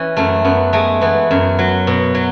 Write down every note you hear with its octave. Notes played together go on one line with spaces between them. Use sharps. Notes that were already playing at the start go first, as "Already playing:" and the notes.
Already playing: E3 C#4
F#2 A3
F#2 B3
G#3 A3
E3 B3
F#2
F#3
B2
F#3